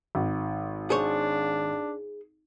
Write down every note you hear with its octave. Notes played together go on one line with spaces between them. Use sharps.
G#1
D4 G#4 C5 C#5